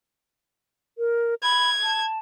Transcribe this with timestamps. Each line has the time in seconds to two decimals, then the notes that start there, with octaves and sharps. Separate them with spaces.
0.98 A#4
1.43 B5 G#6
1.83 A5